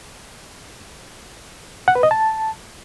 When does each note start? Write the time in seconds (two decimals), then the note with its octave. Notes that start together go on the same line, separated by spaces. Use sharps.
1.88 F#5
1.95 B4
2.03 D#5
2.11 A5